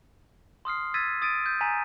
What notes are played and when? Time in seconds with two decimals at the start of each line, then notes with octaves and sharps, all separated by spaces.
0.65 C6 D#6 F6 C7
0.94 E6 G#6 A6 B6 D#7
1.22 D#6 A6 D7 D#7
1.46 G6
1.61 G#5 A#5 B6 D#7